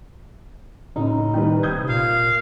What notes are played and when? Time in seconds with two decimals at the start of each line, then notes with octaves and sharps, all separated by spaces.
0.96 F#1 A2 D#4
1.34 D#3 G3 B4
1.63 D1 C3 D#6 G6 G#6
1.89 F#1 A#2 F5